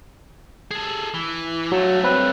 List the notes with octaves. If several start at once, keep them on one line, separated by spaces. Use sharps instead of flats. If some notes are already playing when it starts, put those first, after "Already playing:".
G#4 A4
E3
G2 F#3 A3
C4 B4 C#5